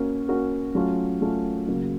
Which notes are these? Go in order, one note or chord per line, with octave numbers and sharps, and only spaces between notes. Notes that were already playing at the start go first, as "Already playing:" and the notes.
Already playing: A#3 C#4 F#4 A#4
A#3 C#4 F#4 A#4
F#3 A3 C#4 F4
F#3 A3 C#4 F4
C#3 F#3 A#3